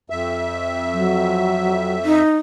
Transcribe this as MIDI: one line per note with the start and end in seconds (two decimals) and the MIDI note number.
0.10 2.22 41
0.10 2.22 76
0.93 1.97 54
2.05 2.36 63